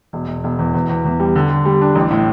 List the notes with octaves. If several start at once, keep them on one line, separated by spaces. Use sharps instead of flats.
E1
E1
E1
E2
E2
E2
E2
G3
D3
D3
G3
D4
A1
A2